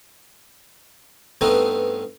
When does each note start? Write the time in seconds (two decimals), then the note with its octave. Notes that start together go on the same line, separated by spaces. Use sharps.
1.41 G2 A3 B3 C4 D#4